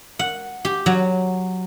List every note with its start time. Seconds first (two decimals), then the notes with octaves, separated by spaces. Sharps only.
0.19 F#5
0.65 G4
0.86 F#3